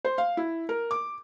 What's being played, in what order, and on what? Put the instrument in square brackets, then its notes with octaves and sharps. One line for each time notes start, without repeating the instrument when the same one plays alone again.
[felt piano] C5
F5
E4
A#4
D6